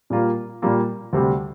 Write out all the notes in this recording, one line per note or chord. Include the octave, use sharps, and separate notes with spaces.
A#2 G3 A#3 F4
A#2 G3 A#3 F4
D2 C3 G3